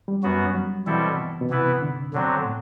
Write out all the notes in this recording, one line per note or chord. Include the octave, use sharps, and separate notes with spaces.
G3
F#2 F#3 B3 F#4
F#3
B2 E3 G3 C4 E4 A4
B2
B2
C3 E3 B3 E4 B4
D3
B2 D3 F#3 C4
A2